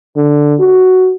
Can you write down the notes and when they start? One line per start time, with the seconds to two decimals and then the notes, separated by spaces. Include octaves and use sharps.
0.16 D3
0.60 F#4